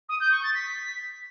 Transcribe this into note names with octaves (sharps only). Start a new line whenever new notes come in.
D#6
G6
C#6
A6
B6